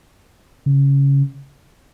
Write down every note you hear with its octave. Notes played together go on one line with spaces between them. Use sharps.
C#3